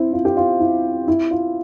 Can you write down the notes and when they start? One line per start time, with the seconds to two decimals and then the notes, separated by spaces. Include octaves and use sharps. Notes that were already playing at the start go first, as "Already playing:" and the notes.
Already playing: C4 E4
0.13 F4
0.25 G4
0.37 F4
0.60 E4
1.08 E4
1.31 F4